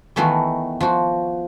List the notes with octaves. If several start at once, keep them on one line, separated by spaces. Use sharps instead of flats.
D#3 E3 A3 B3 F#4 A#4
F3 F#4